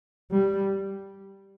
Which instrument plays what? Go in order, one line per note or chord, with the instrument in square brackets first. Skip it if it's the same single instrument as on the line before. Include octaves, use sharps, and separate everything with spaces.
[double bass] G3